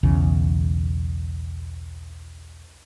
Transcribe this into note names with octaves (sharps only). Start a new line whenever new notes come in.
B1 E2 C#3